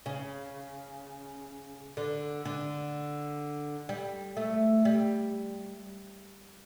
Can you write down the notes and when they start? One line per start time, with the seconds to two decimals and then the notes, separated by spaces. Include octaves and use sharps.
0.06 C#3
1.97 D3
2.45 D3
3.89 G3
4.37 A3
4.85 G3